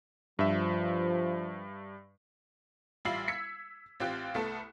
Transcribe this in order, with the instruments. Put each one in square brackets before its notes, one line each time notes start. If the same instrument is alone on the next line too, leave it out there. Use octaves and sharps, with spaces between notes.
[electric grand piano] G2 E5 [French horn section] F3
[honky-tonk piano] A1 G3 F4 E5 C7 F#7
E6 G#6 B6 C#7
A1 C4 F4 G4 F#6
C2 A3 B3 A4